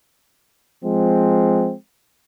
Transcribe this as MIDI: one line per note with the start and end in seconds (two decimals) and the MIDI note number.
0.84 1.74 53
0.84 1.74 56
0.84 1.74 60